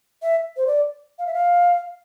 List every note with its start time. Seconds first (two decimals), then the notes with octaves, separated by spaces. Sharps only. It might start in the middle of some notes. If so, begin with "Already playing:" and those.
0.22 E5
0.57 C5
0.67 D5
1.19 F5
1.26 E5
1.34 F5